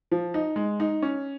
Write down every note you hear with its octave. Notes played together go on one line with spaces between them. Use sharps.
F3
D#4
G#3
D#4
C#4